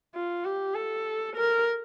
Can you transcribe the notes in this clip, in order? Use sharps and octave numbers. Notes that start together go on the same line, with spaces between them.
F4
G4
A4
A#4